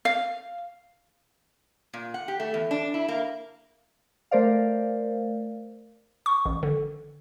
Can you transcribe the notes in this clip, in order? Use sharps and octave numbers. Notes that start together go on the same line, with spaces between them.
F5
A#2
F#5
G4
A3
E2
D4
E4
A#3
A3 A#4 C5 D5 F5
C#6
A1
D3